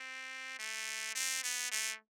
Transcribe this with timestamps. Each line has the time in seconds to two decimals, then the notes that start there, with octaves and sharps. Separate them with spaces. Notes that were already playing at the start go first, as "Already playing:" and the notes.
Already playing: C4
0.59 A3
1.15 C4
1.43 B3
1.72 A3